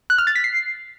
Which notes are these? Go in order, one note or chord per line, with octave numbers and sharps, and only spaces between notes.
F#6
F6
A6
B6
C7